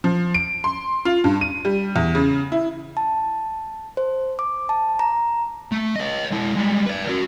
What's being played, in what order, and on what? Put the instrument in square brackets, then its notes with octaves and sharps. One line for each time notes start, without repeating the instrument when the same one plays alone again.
[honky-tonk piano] F3
D7
C6
F4
G2
D#7
G3
E2
C#3
E4
[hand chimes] A5
C5
D6
A5
A#5
[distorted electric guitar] A3
C#5 D#5
G#3 E4
G3 G#3
B4 D5
F#4 A#4